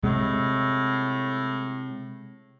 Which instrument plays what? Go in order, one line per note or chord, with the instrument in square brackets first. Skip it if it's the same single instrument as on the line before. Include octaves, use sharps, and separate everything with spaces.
[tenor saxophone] A2 [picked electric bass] C3 G#3